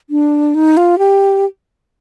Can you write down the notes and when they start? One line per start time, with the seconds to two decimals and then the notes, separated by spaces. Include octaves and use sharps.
0.10 D4
0.55 D#4
0.77 F4
0.98 G4